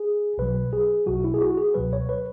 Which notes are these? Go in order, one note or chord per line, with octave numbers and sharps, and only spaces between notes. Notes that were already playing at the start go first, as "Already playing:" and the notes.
Already playing: G#4
B1 B2 F#3 B4
G#4
B1 B2 F#3 F#4
E4
G#4
F#4
G#4
C#2 B2 F#3 B4
C#5
B4